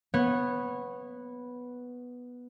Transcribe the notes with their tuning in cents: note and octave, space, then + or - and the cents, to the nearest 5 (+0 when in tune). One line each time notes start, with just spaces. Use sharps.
B3 -5 C#5 -20